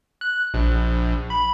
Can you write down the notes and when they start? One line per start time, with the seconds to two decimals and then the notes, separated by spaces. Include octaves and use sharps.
0.21 F#6
0.54 A#1
1.30 B5